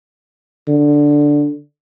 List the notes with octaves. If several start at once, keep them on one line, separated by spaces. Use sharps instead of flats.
D3